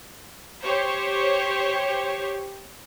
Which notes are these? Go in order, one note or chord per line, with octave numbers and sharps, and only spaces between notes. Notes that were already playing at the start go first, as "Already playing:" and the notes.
G4 C5 C#5